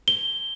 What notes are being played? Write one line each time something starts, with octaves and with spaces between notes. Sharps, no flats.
G7